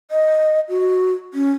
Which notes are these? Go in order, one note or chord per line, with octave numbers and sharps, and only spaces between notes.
D#5
F#4
C#4